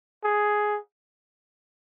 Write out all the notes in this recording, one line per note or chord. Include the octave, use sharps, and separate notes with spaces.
G#4